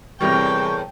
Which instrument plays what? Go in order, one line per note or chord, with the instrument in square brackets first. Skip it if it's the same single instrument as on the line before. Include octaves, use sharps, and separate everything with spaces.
[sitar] E2 A2 A#4 [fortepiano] C3 G3 [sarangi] G5 [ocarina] C#6